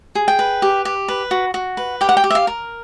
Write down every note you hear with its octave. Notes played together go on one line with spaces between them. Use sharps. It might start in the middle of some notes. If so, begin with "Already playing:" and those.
G#4
G5
B4
G4
G4
B4
F#4
F#4
B4
G4 G5
F#5
G5
G4
E5
F5
A#4